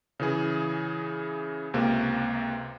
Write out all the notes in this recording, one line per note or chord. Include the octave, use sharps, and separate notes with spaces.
C#3 E3 G#4
C#2 C3 A#3